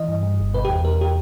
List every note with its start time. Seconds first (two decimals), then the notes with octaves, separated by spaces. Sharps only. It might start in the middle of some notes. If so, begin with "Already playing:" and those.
Already playing: E3 D#5
0.08 G2
0.23 G2
0.40 G1
0.54 B2 B4
0.65 G4
0.69 E2
0.85 B2 A#4
1.01 G4